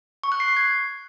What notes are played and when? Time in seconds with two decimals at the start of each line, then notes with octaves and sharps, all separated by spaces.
0.23 C#6
0.32 F#6
0.40 C7
0.48 C#6
0.57 G#6